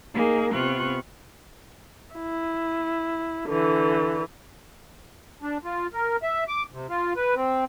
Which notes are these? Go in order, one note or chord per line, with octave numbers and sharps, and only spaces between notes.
A#3 D#4 G#4 A#4
C3 B3 F4 C#6 F#6
E4
D3 E3
D4
F4
A#4
E5
D6
C3
F4
B4
C4